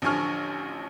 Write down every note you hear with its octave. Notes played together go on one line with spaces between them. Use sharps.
A1 D3 F3 G#5 C#6 F6